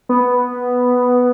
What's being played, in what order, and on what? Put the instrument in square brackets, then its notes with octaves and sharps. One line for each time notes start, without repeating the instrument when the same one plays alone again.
[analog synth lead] B3